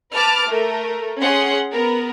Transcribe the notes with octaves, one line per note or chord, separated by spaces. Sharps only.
B4 A5 D6 F6
A3 A#4
C#4 G#4 F#5 C6
B3 A#4